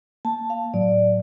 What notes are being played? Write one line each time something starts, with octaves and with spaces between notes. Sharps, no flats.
A#3 A5
F5
A2 F#3 D5